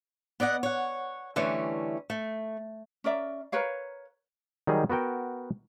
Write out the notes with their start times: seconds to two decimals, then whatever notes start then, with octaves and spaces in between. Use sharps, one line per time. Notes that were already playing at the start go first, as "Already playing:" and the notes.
0.40 B3 D5 D#5 F#5
0.63 C#5 F#5
1.36 D3 E3 G3 A3 C#4
2.10 A3
3.04 C#4 A#4 D5 E5
3.52 A#4 B4 C#5 F5
4.67 D#3 F#3 G3 D#4 G#4
4.90 B3 F#4 A#4 G5